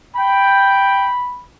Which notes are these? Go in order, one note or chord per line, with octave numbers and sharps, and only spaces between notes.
G5 B5